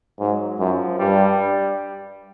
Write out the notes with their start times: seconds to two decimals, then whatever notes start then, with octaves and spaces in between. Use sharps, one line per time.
0.19 G#2 F#3
0.59 F#2 F3
0.99 G2 G3